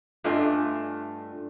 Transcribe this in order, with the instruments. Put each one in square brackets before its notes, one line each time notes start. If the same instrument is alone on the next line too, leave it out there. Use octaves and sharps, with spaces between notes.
[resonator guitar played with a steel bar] G2 A3 D4 F4 D#5 G#5